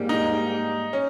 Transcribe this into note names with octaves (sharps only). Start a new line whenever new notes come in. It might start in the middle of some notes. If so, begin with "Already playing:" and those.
Already playing: G#2 G3 A#3
D#4
C#4